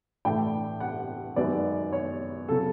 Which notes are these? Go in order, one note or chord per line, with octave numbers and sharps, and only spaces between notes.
A2 E3 A3 D4 G5
F#5
F#2 D#3 G#3 B3 D5
C#5
C#3 F#3 A4